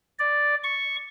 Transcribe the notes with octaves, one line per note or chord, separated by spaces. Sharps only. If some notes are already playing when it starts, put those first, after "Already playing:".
D5
C#6